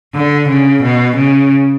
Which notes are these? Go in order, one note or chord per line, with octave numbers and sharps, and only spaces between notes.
D3
C#3
B2
C#3